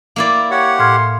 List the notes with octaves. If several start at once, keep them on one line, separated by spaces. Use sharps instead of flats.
A#3 E4 D5
G4 C#5 F#5
A2 C6 F6 G#6